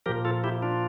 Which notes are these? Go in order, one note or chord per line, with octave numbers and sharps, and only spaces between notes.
A#2 F3 G4 A#4
F4 A4
E4 G4
D4 F4